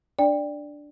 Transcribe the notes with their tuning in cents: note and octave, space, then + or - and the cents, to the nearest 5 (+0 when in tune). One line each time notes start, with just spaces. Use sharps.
D4 +0 D5 +0 G5 +20